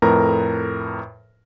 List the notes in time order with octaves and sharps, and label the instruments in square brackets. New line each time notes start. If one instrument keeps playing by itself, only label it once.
[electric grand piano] F2 A2 A#4 B4 A#5